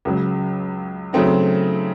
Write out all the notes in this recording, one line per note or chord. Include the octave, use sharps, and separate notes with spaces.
C#2 C#3 F#3
C#3 F#3 A3 C4 D#4